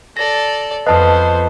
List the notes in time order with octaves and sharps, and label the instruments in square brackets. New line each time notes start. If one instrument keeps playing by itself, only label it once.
[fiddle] A4 D5 [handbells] A#6
[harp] F2 F5 [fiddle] B3 C5 [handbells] B4 [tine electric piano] D#5 A5 D#6